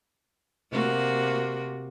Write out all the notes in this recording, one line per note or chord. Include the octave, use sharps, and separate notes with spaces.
C3 A#3 F#4